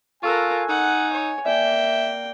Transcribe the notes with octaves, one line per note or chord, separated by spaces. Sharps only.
F4 A4 A#4 G#5 C#6 E6 F#6
D#4 F#5
C#5
A#3 D5 E5 G5